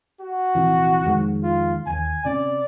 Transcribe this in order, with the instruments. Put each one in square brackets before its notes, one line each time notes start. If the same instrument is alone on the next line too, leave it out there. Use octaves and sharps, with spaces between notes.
[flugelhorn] F#4
[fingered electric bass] A#1 C3 E3
F2 D#3 G#3
[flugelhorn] F4
[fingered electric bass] E1 D#2 [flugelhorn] G#5
[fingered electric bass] C3 C#4 [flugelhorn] D5